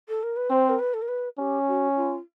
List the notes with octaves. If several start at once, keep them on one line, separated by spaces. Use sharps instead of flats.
A4
A#4
B4
C4 C5
A#4
B4
A4
A#4
B4
C#4 G4
F#4
F4